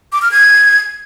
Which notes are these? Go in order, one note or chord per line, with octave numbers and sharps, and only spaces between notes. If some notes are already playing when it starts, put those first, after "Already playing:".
D6
F6
G#6